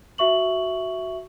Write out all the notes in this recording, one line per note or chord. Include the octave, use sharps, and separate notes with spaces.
F#4 E5 C#6 F#7